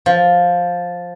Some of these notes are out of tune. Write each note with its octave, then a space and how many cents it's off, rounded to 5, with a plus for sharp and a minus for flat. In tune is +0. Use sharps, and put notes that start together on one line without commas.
F3 +10